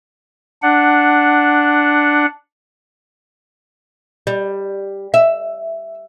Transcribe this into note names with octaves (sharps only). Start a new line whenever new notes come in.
D4 F#5
G3
E5